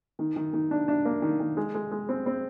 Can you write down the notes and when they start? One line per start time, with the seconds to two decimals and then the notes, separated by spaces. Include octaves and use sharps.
0.19 D#3
0.36 D#3
0.53 D#3
0.71 D4
0.88 D4
1.05 A#3
1.22 D#3
1.40 D#3
1.57 G#3
1.75 G#3
1.91 G#3
2.09 C4
2.26 C4